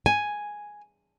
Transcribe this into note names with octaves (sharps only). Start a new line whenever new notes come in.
G#5